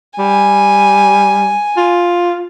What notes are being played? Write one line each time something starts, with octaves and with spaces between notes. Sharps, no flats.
G3 G#5
F4